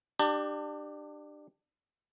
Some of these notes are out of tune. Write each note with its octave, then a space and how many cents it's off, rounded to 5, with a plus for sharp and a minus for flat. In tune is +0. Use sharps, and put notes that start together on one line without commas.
D4 +25 G4 +0 A5 +35